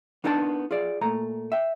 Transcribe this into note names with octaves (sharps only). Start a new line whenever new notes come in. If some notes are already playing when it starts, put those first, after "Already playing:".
B3 D4 D#4 A#4 G5 A5
F4 G#4 D5
A#2 A3 A#5
E5 G5